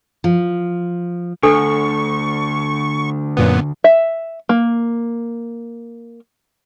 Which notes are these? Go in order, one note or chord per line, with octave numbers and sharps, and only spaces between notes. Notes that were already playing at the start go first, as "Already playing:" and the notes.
F3
D2 D4 A4 C#6
F#2 A#2 B3
E5
A#3